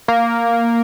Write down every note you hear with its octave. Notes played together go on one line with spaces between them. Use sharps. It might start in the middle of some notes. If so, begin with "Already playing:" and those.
A#3